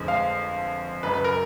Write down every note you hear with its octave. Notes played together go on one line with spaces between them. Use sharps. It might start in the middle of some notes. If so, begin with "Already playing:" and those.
Already playing: G1 F2 D3 F3 G#3
F5
F#1 F#2 C#3 B4
B4
A#4